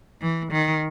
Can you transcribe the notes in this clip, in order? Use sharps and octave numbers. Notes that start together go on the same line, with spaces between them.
E3
D#3